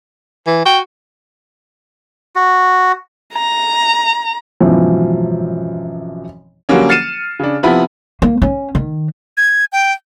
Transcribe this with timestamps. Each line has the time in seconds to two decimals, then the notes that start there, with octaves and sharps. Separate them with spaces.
0.47 E3
0.66 F#4 G5
2.35 F#4
3.33 A#5
4.60 G#1 F#2 B2 E3 F3
6.69 D3 F#3 G3 A#3 C#4
6.89 F6 A6 C7 C#7 D#7 E7
7.39 C#3 D4
7.63 C3 F3 B3 E4 B5
8.22 A#3
8.42 C#4
8.75 D#3
9.37 G#6
9.72 G5